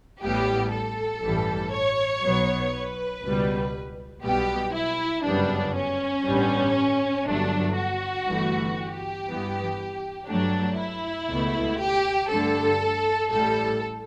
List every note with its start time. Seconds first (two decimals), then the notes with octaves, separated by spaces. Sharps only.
0.21 A1 A2 G3 B3 G4
0.71 A4
1.22 A1 G2 E3 G3
1.73 C#5
2.22 B1 B2 F#3 B3
2.72 B4
3.23 C#2 B2 G3
4.23 B1 B2 G3 B3 G4
4.74 E4
5.24 G1 F#2 C#3 G3 B3 D4
5.75 C#4
6.25 A1 G2 D3 G3 B3
7.26 G1 G2 F#3 A3 D4
7.76 F#4
8.27 G1 G2 E3 A3
8.77 G4
9.28 G2 E3 B3
10.28 G2 F#3 A3 D4
10.78 E4
11.29 C#2 B2 A3
11.79 G4
12.29 G2 D3 A3 A4
13.30 A1 A2 G3 A4